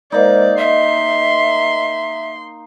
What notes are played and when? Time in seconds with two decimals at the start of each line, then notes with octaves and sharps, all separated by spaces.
0.12 G#3 A#3 D#4 C5 D5
0.58 D#5 E5 C6